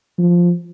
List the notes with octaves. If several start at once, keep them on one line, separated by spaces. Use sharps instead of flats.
F3